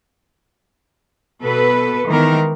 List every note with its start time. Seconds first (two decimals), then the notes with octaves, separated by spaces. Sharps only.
1.42 B2 A4 B4
2.06 D#3 E3 G#3 B3 A#4